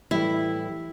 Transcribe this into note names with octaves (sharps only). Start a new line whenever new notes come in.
A2 E3 G3 E4